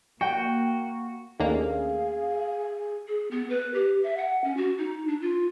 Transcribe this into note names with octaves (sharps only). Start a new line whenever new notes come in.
A#3 F#4 G5
D#2 A3 A#3 C#4 D4 G#4 F5
G#4
B3
B4
G4
E5
F#5
C#4
F#4
D#4
D4
F4